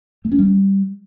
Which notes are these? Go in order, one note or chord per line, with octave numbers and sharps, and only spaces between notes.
A3
C#4
G3